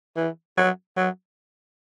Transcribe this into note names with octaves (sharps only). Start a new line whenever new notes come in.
E3
F#3
F#3